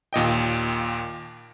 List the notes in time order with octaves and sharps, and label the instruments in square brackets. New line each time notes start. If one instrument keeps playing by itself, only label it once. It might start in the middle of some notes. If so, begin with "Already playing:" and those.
[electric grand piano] D#2 A#2 D#5 G5